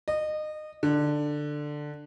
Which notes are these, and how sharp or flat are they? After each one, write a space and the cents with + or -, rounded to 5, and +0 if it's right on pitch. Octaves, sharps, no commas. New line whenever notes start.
D#5 -25
D3 +10